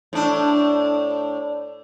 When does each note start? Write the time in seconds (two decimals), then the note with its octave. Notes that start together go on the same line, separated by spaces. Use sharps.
0.13 A2 D4